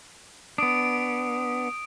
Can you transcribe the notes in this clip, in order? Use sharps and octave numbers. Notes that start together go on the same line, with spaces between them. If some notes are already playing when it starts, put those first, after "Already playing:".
B3 D4 D#6 D7